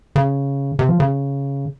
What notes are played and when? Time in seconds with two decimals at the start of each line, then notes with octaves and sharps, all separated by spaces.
0.16 C#3
0.79 C3
0.89 F3
1.00 C#3